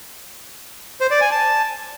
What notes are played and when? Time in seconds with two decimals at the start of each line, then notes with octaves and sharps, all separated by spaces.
1.01 C5
1.11 D5
1.21 G#5
1.31 A5